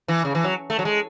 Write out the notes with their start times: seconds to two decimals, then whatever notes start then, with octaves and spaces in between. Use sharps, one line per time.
0.08 E3
0.25 C#3
0.35 E3
0.44 F#3
0.70 A3
0.79 F#3
0.85 G#3